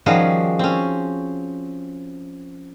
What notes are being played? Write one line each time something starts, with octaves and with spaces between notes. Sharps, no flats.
D#3 F3 G3 C#4 F#4 G#4
C4 C#4